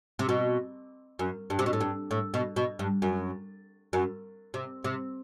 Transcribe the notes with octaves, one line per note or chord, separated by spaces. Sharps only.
C3
B2
F#2
G2
C3
B2
A2
G2
A2
B2
B2
G2
F#2
F#2
C3
C3